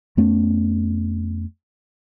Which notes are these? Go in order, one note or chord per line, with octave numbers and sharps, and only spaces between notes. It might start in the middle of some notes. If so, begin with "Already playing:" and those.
F2 A3 B3 C#4